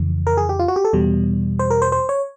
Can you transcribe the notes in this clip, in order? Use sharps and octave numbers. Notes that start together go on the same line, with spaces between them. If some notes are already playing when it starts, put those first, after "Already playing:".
Already playing: F2 C#3 E3
A#4
G#4
G4
F4
F#4
G4
A4
E2 B2 G3
C5
A#4
C5
C5
C#5